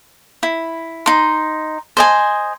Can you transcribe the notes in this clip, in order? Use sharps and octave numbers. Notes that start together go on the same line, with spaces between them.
E4
D#4 C6
C5 D#5 G#5